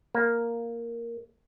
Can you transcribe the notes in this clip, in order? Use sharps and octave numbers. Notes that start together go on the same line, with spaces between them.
A#3